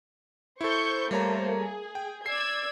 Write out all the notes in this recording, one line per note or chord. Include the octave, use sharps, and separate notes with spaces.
E4 A4 C5 C#6 G6
G3 A3 A#3 C5 C#5 A#5
G#4
G5
D5 E6 G#6 C7